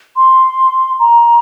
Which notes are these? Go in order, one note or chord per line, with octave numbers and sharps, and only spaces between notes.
C6
A#5